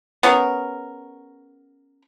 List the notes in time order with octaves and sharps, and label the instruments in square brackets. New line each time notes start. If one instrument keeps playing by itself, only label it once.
[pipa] B3 C#4 G#4 A#4